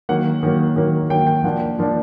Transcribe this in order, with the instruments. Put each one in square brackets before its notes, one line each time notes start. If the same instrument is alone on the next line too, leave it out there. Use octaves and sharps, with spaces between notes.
[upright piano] D#3 F#3 A#3 F#5
D#3 F#3 A#3
D#3 F#3 A#3
D#3 F#3 A#3 G5
G5
F3 A#3 D4 F#5
F3 A#3 D4